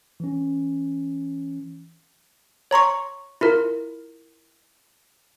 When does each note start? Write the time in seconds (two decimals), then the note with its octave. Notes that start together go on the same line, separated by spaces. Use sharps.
0.20 E3 C#4
2.71 C#5 A#5 C6 C#6
3.41 E4 F4 A#4